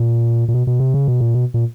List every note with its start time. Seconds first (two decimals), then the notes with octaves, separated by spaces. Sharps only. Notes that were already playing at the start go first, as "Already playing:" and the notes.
Already playing: A#2
0.48 A#2
0.54 B2
0.67 B2
0.80 C3
0.94 C#3
1.08 B2
1.21 A#2
1.34 B2
1.54 A#2